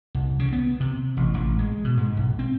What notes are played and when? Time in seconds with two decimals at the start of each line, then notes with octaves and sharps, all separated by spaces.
0.15 C2
0.39 C#3
0.53 B3
0.80 C3
1.17 A1
1.34 A1
1.59 G#3
1.84 B2
1.97 G#2
2.17 B1
2.39 C4